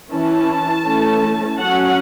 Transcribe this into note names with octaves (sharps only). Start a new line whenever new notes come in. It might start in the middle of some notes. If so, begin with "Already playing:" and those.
E3 C#4 A5
E3 A3 C#4
F#3 C#4 F#5